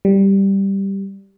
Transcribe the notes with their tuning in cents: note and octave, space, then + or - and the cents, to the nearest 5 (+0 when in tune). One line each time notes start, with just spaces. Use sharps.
G3 +0